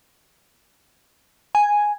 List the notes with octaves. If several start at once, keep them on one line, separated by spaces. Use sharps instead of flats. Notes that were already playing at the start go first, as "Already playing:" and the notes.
G#5